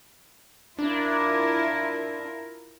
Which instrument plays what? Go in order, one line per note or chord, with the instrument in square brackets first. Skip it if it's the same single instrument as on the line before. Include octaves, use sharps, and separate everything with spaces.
[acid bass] D4 [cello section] E4 F4 A#4